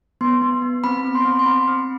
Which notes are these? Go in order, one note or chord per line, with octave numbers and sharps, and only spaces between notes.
B3 C6
B3
B3
C4 B5
C4
C6
C4
C6
C4 B5
C4